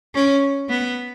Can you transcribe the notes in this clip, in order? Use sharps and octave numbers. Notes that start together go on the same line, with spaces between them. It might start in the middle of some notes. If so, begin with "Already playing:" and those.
C#4
B3